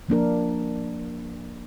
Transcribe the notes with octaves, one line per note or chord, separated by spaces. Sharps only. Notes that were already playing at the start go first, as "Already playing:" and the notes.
F3 A#3 D4 A#4